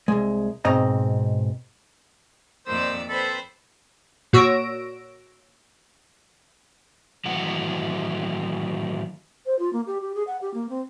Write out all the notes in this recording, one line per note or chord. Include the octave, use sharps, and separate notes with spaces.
C2 G#3
G#2 B2 C4 D#5 A#5
F2 A#2 D#3 C5 D5 E6
C4 A4 B4 C5 B5
A#2 F#4 C#5 E6 A#6 D7
A2 D#3 E3 F#3 F#5
C5
F4
A#3
G4
G4
G#4
F#5
G4
A#3
C4